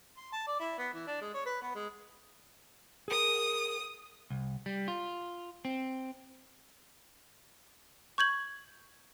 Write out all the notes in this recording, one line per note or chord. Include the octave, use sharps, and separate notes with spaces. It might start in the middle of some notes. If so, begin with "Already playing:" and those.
C6
A5
D5
E4
B3
E3
D4
G#3
C#5
B4
B3
G#3
G#4 A#4 D#6
C2
G3
F4
C4
C#6 G6 G#6 F#7